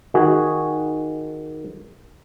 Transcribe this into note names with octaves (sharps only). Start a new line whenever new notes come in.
D#3 F#4 G#4